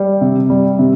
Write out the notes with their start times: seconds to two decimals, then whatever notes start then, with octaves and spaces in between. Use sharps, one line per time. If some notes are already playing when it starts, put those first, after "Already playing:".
Already playing: G3
0.21 C3
0.50 G3
0.79 C3